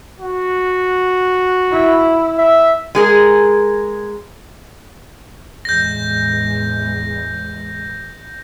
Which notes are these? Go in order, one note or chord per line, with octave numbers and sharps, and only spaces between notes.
F#4
E4
E5
G#3 G#4 A#4
E2 A2 G#3 G6 A#6